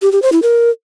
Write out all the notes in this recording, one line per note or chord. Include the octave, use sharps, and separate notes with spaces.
G4
G4
C5
E4
A#4